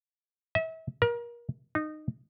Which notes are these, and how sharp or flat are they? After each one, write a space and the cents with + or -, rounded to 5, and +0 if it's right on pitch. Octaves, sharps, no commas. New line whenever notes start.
E5 -35
A#4 +30
D#4 -20